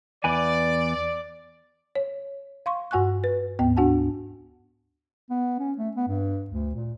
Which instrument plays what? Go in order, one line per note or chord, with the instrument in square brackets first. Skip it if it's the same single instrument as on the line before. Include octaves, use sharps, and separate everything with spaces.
[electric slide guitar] E2 B4 G#5 [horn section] D5
[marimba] C#5
F5 C6 C#6
G2 F#4 F#5 G#5 C#6 F#6
B4
D2 G#2 B3 G5
D4 F#4 F#5 G#5 A5
[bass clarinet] B3
C#4
A3
B3
G2
D2
A#2